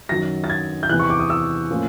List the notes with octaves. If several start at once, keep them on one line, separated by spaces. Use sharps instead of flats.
F#2 D#3 F#3 A#6
A6
G#6
G6
E2 C3 E3 F#6
C#6
D6
D#6
E6
A2 F3 A#3 C#4 F4